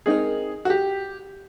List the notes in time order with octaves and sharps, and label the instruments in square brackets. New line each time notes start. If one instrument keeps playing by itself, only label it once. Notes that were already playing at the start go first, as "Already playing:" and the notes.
[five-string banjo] G#3 C4 D#4 F#4 A#4 [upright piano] G#4
[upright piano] F#4
G4